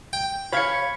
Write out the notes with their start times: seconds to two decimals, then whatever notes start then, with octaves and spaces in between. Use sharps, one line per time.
0.13 G5
0.53 C#5 F5 B5 G#6 C#7